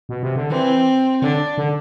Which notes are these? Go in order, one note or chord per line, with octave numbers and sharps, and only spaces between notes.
B2
C3
D3
E3 C4
D3 D4
D3